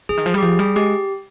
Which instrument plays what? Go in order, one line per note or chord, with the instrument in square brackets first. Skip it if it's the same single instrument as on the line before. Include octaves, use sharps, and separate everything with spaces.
[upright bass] D3 [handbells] G#4
[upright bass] D#3
F3
G3
[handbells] G4
[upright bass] F3 [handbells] G#4
[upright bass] G3 [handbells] G#4
[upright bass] G#3 [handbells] G4